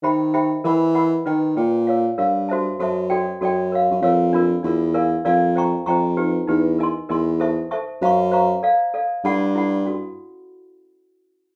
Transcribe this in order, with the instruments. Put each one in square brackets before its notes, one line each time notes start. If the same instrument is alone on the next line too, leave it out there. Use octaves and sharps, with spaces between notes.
[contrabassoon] D#3 [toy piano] G4 C5 E5 G5 B5
[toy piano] G4 C5 E5 G5 B5
[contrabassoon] E3 [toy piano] A#4 D#5 F#5 B5
[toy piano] A#4 D#5 F#5 B5
[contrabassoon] D#3 [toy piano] B4 D#5 G5
[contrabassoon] A#2 [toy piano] B4 D#5 G5
[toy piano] A#4 C#5 F5
[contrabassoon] G2 [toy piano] A#4 C#5 F5
[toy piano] F#4 A4 C5 E5 A5
[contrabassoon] F#2 [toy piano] F#4 A4 C5 E5 A5
[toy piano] F#4 A4 D5 G5
[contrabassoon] F#2 [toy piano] F#4 A4 D5 G5
[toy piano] A#4 C#5 F5
[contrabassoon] F#2
[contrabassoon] F2 [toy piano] A#4 C#5 F5
[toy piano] D4 F4 A#4
[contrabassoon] E2 [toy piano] D4 F4 A#4
[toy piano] A#4 D5 F5 G#5
[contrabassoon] F2 [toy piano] A#4 D5 F5 G#5
[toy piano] C5 D#5 G5 A#5 C#6
[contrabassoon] F2 [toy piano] C5 D#5 G5 A#5 C#6
[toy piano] D#4 G4 B4
[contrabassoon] E2 [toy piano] D#4 G4 B4
[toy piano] A#4 D#5 G#5 C6
[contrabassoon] E2 [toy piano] A#4 D#5 G#5 C6
[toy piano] A4 C5 E5 A5 C#6
A4 C5 E5 A5 C#6
[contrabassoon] F#2 [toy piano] C5 F5 A#5 C#6
[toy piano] C5 F5 A#5 C#6
A4 D5 F5
A4 D5 F5
[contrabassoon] G2 [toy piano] E4 A4 D5 F#5 B5
[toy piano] E4 A4 D5 F#5 B5
C#4 F#4 A4